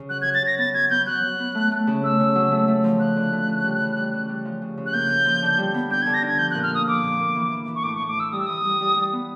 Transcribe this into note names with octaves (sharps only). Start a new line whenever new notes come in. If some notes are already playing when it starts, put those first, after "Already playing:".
Already playing: C#3
F#3 F#6
G#6
F#3
A6
C#3 A#6
B3 A6
F#3 G#6
B3 G6
F#3 F#6
F#3
B3
A3
A3
C#3
A3 E6
C#3
F#3
A3
A3
F3
F3 F#6
D3
A3
C#3
G3
E3
G3
C#3
G3
F3
C#3
C#3
F#6
A#3 G6
A#3
F3
D3
G3
B3
D4 G6
G#6
D3
A#6
D4 G#6
F3 G6
F#6
A#2
F6
A#3 D#6
F3 D6
A#2
A#3
E3
E3
E3
C#6
A2 D6
C#6
A2
D6
E3 E6
G3 D#6
E6
E3 D#6
G3
G3
G3
B3